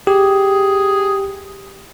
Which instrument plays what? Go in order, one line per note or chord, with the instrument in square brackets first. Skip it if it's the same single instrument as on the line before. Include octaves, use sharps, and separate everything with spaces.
[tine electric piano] G4 [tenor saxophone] G#4